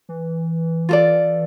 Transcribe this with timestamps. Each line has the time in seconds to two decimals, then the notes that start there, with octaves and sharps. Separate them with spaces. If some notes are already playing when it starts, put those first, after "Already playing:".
0.09 E3
0.89 F4 A4 D5